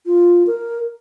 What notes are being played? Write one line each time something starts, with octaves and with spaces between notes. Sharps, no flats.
F4
A#4